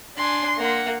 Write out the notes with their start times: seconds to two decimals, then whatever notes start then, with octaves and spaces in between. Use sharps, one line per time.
0.17 D4 G#5 C6
0.57 A#3 F#5